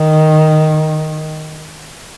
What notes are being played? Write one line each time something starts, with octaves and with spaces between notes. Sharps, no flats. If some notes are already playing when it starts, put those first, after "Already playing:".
Already playing: D#3